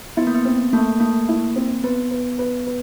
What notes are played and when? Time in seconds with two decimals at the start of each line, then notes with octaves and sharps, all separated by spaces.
0.17 B3 E4
0.27 A#3
0.35 B3
0.45 B3 C4
0.73 A3 A#3
1.00 A3 A#3
1.29 E4
1.56 C4
1.84 B3 B4
2.11 B4
2.38 B4
2.67 B4